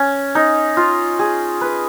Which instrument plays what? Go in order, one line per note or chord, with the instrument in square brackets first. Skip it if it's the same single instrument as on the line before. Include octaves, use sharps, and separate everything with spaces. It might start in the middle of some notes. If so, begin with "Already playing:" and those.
Already playing: [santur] C#4
D#4
F4
G#4
B4